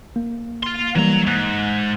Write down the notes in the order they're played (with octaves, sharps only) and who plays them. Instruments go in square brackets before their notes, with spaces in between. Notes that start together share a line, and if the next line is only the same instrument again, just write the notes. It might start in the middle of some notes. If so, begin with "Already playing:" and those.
[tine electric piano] A#3
[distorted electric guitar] F5 C6
[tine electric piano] E3 G3 A#3 [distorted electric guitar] F#3 A#5
[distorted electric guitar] G#2 [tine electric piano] F#6 B6